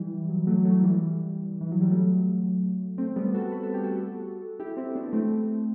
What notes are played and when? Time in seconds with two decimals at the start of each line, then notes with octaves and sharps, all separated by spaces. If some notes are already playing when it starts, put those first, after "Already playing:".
Already playing: E3 G3
0.29 F#3
0.47 F#3 A3
0.65 F#3 A3
0.83 E3 G3
1.61 E3
1.72 F#3
1.81 G3
1.90 F#3 A3
2.98 A3 C4
3.16 G3 B3
3.34 F#4 A4
3.52 B4
3.63 A4
3.74 G4
3.83 F#4 A4
4.59 E4 G4
4.77 C4 E4
4.95 B3 D4
5.13 A3 C4